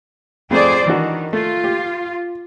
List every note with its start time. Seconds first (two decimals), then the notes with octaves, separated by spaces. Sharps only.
0.51 F2 A3 G#4 C5 D5 C#6
0.87 D#3 E3 D4 F#4
1.33 A3 F4
1.64 G4